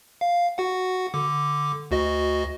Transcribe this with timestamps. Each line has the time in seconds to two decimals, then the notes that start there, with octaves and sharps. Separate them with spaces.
0.21 F5
0.58 F#4 F#5
1.14 D3 D6
1.91 D2 F#4 D#5